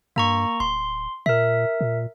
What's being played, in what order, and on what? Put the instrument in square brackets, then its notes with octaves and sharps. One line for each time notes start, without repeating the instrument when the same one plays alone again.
[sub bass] G2 [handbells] A#3 A#5 C#6
[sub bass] D1 [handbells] C6
[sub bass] A#2 [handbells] A#4 E5
[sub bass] A#2